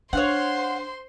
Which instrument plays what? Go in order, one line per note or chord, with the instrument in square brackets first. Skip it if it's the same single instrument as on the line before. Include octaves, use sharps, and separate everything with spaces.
[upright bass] D4 [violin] C5 C6 [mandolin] C#5 F5 F#5